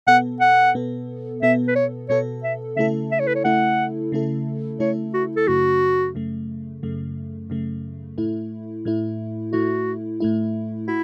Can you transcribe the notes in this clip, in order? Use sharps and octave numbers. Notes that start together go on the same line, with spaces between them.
B2 B3 A4 F#5
F#5
B2 B3 A4
B2 B3 A4 E5
B4
C#5
B2 B3 A4 C#5
E5
C#3 A3 E4 A4 E5
E5
C#5
B4
C#5
C#3 A3 E4 A4 F#5
C#3 A3 E4 A4
C#3 A3 E4 A4 C#5
F#4
A4
F#2 C#3 A3 F#4
F#2 C#3 A3
F#2 C#3 A3
F#2 C#3 A3
A2 A3 E4
A2 A3 E4
A2 A3 E4 F#4
A2 A3 E4
E4 F#4